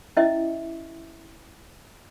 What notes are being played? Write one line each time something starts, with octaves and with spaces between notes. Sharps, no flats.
C#4 E4 D#5 E5